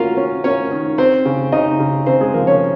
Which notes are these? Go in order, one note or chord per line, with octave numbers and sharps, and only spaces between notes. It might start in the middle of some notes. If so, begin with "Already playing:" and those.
Already playing: A#3 C#4 F4 F#4 F5
C#4
A#3 C#4 C#5
D#3
C4 C5
C#3
C#3 D#4 D#5
C#3
C#3 C4 C5
G#3 G#4
F3 A#3 A#4
C#4 C#5